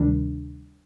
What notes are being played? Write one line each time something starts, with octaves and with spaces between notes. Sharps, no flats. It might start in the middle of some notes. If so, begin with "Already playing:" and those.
Already playing: D2 C3 D#3 G3 D4